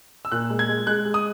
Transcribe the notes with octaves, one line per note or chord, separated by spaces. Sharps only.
E6
A#2 F#6
G#3
G#6
G#3
G#3 F#6
G#3
D#6